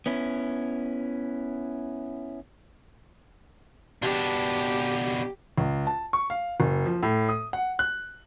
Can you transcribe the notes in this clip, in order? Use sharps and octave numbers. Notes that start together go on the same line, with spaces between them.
B3 C#4 E4
B2 D4 G4
C#2
A5
C#6
F5
F#1
F3
A2
D#6
F#5
F#6